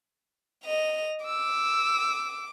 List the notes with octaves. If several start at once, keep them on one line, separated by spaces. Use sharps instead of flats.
D#5 F7
D6 E6